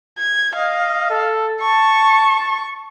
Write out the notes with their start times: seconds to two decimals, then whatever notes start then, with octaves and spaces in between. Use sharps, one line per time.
0.18 G#6
0.56 D#5 F5
1.10 A4
1.61 A5 C#6